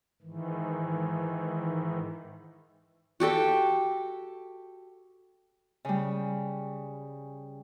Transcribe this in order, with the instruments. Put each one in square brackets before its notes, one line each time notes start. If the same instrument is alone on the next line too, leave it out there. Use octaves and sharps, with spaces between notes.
[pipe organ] G#2 D#3 E3
[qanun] F#4 G4 A4 G5
[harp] C#3 G3